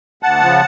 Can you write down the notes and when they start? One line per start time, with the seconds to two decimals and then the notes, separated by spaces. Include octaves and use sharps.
0.23 D2 F#5 A5
0.42 C#3 F3